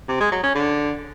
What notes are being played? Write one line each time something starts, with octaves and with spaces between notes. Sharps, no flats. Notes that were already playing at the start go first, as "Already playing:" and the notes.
C3
G#3
F#3
C#4
D3